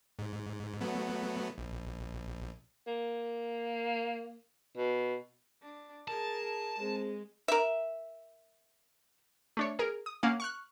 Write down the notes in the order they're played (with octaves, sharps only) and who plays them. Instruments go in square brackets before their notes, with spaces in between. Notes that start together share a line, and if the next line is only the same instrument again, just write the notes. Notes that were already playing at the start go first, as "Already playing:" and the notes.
[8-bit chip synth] G#2
F#3 A3 B3
A#1
[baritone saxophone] A#3
B2
[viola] D4
[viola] G#4 A#4 [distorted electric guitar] A5
[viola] G#3 [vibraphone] C4 G#4 C5
[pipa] A#4 E5
[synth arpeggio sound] A3 D4 C#5
G#4 A#4
D#6
A#3 C#4 F5 F#5
C#6 F6 F#6